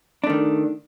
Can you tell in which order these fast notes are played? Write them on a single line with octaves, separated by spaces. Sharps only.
D4 A3 D#3